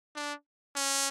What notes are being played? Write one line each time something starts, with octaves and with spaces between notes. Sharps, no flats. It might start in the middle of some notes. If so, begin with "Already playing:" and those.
D4
C#4